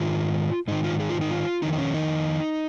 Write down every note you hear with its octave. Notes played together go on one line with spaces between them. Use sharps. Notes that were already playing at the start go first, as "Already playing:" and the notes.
Already playing: G#2 D#3 F4
G#2 D#3 D#4
F4
G#4
F4
D#4
F4
F2 D#3 D#4
D#4
C#4
D#4